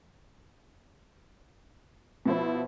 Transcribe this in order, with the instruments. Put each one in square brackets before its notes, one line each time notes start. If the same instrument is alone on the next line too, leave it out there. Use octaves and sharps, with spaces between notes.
[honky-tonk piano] B2 F3 C5 [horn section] B3 E4